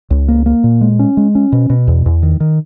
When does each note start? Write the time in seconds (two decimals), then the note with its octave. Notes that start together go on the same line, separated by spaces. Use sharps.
0.11 C#2
0.28 A#3
0.46 A#3
0.64 A#2
0.81 G#3
0.99 C#4
1.17 G#3
1.35 C#4
1.52 B2
1.70 B2
1.88 E2
2.06 E2
2.23 D#3
2.40 D#3